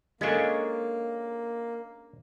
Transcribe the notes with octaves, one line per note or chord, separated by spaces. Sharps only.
G#3 A#3 C#4 D4 A4 F5 G#5 C#6